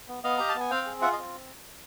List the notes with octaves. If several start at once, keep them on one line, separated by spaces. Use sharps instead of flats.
B3
B3 D#5 F5
G4 A#5
A5
B3 G#5
C4 F5 G5
G#4
F4 E5 F#5
D#5 F5
C4